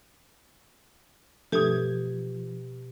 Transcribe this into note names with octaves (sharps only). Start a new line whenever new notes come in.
G2 B2 F3 A3 G4 G#6